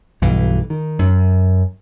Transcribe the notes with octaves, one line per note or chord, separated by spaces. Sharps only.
B1 G2 E3
D#3
F#2